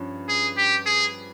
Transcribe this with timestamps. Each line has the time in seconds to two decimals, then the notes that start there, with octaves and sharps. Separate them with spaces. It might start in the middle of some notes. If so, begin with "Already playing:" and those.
Already playing: G2 F3 C#4
0.29 G#4
0.57 G4
0.86 G#4